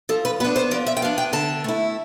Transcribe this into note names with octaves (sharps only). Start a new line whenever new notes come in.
F3 A4
B4
B3 D4 B4
C5
F3 D5
E5
G5
B3 D4 F5
G5
D3 A5
A3 E4